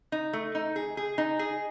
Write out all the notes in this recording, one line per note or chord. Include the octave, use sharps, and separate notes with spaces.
D#4
A3
D#4
G#4
G#4
D#4
G#4